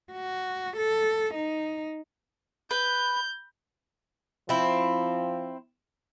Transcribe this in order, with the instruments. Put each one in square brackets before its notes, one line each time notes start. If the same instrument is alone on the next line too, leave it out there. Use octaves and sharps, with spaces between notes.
[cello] F#4
A4
D#4
[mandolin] B4 [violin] G6
[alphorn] F3 [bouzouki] C4 E4